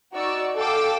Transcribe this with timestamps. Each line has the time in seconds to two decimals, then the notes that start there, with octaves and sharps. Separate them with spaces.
0.13 D#4 F#4 D5 C#6 E6
0.56 A4 F5 G5 D6 E6